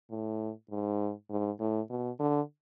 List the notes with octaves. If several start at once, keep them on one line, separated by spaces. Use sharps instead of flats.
A2
G#2
G#2
A2
B2
D3